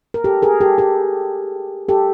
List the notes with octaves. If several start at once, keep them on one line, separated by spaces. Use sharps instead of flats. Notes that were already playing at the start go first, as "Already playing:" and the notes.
A#4
G4 A4
G#4 A#4
G4 A4
G4 A4
G4 A4